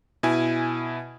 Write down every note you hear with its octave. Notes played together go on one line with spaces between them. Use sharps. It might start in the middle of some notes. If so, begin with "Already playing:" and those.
B2 E4 G#5